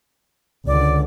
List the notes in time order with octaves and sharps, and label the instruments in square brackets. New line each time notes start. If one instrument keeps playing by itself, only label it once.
[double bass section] C#2 D3 [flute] D5